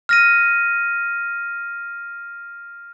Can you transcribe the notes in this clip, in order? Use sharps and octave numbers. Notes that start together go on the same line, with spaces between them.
F6 A#6 D#7